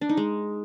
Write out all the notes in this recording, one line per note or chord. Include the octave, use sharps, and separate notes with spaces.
D4
D#4
G#3